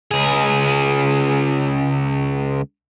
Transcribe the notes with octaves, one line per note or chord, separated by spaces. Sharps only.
C#2 G#4